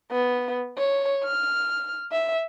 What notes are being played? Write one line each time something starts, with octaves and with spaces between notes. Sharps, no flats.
B3
C#5
F6
E5